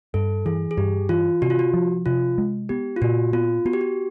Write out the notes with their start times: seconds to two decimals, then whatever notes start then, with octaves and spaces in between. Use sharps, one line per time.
0.14 G2 A4
0.46 E3 G#4
0.71 G#4
0.77 G2 G4
1.09 E3 F4
1.42 C3 F#4
1.50 F4
1.59 F#4
1.74 F3
2.06 C3 F4
2.38 G#3
2.69 B3 G4
2.96 F4
3.02 A#2 F#4
3.33 B3 F4
3.65 B3 F#4
3.73 G4
3.81 F#4